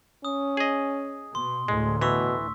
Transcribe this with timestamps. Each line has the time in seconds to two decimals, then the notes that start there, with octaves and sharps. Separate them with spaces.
0.25 C#4 D#6
0.57 G#4 D#5
1.35 B2 C6
1.68 D2 A2 G#3
2.01 B2 E3 C#6 E6 B6